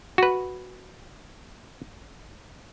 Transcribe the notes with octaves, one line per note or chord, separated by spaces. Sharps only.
F#4 B4